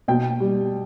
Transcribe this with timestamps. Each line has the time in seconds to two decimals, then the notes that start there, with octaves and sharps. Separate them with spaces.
0.08 B2 G5
0.40 G3